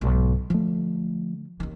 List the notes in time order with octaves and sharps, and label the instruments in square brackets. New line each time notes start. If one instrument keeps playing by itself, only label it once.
[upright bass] B1 G#2
[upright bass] D3 [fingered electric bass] F3 A3
[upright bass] D#2 D#3